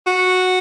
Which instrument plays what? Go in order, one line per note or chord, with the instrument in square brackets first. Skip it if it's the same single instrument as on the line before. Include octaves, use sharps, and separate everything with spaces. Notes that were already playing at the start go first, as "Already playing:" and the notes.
[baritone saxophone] F#4